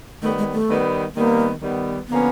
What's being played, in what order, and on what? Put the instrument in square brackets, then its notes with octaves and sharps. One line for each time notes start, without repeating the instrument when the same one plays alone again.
[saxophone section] D#3 G3 B3 [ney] A3
[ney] G#3
A3
[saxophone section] D#3 G3 B3
[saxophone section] D#3 G3 B3 [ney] A#3
[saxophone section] D#3 G3 B3
[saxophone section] D3 F3 A#3 C#4 [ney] B3